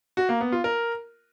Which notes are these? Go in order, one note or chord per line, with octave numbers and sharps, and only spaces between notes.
F#4
A#3
B3
F4
A#4